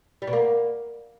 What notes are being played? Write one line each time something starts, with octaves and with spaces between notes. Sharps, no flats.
G3
B2
A#3